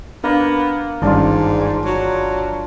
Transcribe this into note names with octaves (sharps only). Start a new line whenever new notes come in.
A#3 B3 D4
G1 G#2 D#3 G3 C#4 D4 F4
F#3